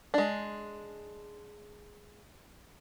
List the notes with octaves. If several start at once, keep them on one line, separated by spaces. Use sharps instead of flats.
G#3 D4